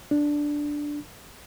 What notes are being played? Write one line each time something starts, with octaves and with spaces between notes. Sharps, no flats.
D4